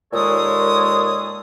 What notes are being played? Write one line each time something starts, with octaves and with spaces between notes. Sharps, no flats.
D#2 A#2 G#3 A4 C#5 D#6